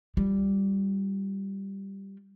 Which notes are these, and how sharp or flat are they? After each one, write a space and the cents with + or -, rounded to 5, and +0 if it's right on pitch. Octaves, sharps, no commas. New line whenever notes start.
G3 +0 F4 +10